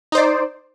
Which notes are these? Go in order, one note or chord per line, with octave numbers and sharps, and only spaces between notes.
D#4 C5 D5